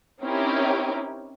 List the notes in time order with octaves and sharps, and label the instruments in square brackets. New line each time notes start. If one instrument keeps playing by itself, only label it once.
[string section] C4 C#4 D#4 E4 G4 A#4